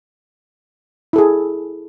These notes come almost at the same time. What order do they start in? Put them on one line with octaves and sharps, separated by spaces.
E4 A4 G#4